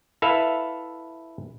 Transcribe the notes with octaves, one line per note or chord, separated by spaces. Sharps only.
E4 A4 B4 E5 F5